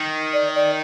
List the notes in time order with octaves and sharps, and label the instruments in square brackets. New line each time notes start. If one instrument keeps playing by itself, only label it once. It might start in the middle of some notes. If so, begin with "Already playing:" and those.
Already playing: [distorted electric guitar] D#3
[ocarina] D5
D5